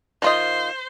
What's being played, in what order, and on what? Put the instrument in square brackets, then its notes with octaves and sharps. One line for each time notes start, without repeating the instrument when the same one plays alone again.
[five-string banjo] D#3 F4 D#5 [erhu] C5